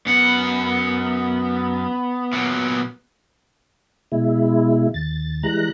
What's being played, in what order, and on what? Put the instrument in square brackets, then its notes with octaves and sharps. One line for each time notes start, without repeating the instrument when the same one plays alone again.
[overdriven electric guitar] F#2 F#5 [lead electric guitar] B3
[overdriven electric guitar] A#2 F#3
[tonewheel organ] B2 G#3 E4
D#2 A6
E3 G3 G#3 A#5 F#6